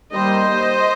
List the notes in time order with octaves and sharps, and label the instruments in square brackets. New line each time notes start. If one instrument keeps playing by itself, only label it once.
[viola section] D#3 G3 A#3 C5 D#5